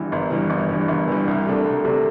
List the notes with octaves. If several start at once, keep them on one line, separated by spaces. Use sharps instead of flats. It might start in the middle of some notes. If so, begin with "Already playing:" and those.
Already playing: G1 G2 E3
G1
G2 E3
G1
G2 E3
G1
G2 E3
C2
C3 A3 D4
C2
C3 A3 D4